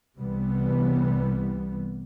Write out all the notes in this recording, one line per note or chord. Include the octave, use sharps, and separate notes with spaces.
C2 C3 E3 G3 B3